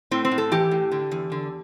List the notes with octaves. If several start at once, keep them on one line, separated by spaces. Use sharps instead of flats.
A2 C4
C4
A2
A4
E3 G4
A2
D3
E2
D3